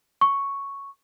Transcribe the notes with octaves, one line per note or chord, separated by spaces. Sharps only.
C#6